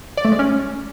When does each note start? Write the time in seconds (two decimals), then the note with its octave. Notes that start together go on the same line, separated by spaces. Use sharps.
0.17 D5
0.25 A3
0.32 G#3
0.39 C#4